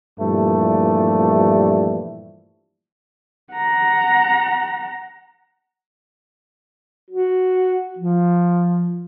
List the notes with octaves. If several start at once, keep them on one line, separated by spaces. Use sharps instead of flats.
G2 A#2 E3 F3 G3 A3
F#5 A#5
F#4
F3